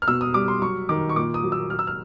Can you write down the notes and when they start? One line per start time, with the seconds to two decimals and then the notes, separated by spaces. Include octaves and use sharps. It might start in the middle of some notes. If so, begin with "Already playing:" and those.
0.02 F6
0.08 B2 E6
0.21 D#6
0.34 G3 D6
0.48 C6
0.61 F#3 C#6
0.89 D#3 D6
1.09 C#6
1.16 A#2 D6
1.34 D#6
1.43 F#3
1.52 E6
1.70 F#3 F6
1.79 E6
1.87 F6